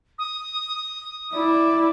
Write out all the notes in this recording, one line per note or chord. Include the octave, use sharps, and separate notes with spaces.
D#6
E4 D5